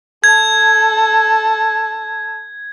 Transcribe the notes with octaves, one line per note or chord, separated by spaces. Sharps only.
A4 A5 G#6